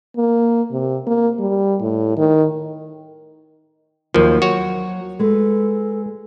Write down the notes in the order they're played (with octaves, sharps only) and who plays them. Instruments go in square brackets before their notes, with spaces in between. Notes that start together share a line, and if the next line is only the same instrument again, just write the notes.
[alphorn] A#3
C3
A#3
G3
A2
D#3
[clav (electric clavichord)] D#2 F3 [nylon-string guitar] F#3 [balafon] A#4
[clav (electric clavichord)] F#4 C#5
[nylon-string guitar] G#3 B4 [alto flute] A4